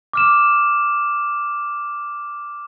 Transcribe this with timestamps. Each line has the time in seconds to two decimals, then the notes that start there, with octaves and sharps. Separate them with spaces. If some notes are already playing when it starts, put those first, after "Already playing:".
0.13 D6 F6 E7